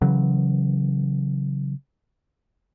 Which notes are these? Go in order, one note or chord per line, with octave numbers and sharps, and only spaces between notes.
C#3 E3 F#3